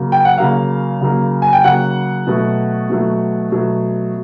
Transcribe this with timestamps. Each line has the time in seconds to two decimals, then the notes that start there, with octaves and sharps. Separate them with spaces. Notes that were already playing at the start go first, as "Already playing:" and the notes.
Already playing: C#3 F#3 A#3
0.12 G5
0.25 F#5
0.38 C#3 F#3 A#3 F5
1.01 C#3 F#3 A#3
1.42 G#5
1.53 G5
1.63 C#3 F#3 A#3 F#5
2.27 B2 F#3 A3
2.89 B2 F#3 A3
3.52 B2 F#3 A3